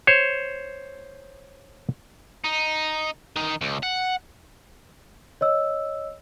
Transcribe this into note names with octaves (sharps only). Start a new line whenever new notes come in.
C5 C#5
D#4
D#3 D#4
C#2
F#5
C#5 D#5 E6